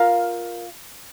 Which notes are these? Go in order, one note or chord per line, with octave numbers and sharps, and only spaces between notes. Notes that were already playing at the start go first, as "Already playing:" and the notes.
Already playing: F4 A#4 F5